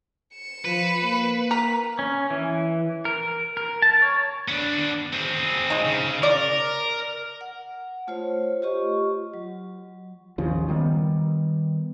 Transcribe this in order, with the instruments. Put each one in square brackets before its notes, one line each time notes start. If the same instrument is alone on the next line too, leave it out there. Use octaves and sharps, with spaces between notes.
[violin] C#7 E7
[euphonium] F3 [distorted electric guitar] B4
[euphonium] A#3
[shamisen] A#4 [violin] B6
[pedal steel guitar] C#4
E3
A#4
A#4
A5
C#5
[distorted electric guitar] B3 D4
C4 G#4
[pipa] G#3 D#4
[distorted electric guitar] C#3
[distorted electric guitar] A#4 [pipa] D5
[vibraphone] F#5
A3 F4 C5 C#5
F4 G4 D#5 C#6
F#3
[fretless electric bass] A1 D#2 C#3 F3
D#3 G3 B3